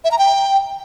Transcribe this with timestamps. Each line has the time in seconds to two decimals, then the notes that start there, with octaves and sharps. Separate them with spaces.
0.04 E5
0.11 A#5
0.19 G5